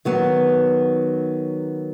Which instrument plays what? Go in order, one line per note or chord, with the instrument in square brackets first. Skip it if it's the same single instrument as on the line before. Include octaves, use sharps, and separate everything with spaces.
[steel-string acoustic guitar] D#3 F#3 B3